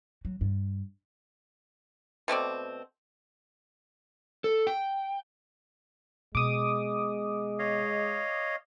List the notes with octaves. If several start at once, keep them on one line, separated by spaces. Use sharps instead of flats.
F#3
G2
B2 A3 C4 D5
A4
G5
B2 G#3 D6 D#6
C#5 D#5 F5